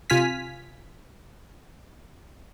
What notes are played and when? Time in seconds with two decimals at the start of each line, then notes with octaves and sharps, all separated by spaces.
0.10 C3 F4 G#5 F6 B6